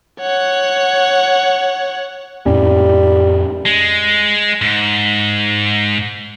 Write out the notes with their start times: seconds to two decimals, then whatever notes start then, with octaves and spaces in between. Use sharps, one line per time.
0.20 C#5 F#5
2.46 F2 A2 G3 C#4
3.66 G#3
4.62 G#2